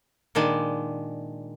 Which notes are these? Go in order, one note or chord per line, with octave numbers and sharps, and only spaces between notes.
A#2 D#3 G#3 D4